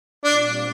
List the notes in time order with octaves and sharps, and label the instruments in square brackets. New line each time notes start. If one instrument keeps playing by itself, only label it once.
[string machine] A#2 G3 C4 F4 [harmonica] D4